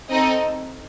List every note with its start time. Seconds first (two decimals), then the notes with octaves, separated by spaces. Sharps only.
0.09 C4 D#4 A4 D#5